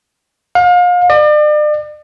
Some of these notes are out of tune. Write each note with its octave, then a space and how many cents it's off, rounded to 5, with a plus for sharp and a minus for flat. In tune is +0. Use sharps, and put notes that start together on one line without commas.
F5 +35
D5 +40